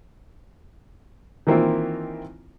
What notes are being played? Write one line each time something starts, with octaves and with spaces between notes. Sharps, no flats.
D#3 E3 A#3 C4 E4 F4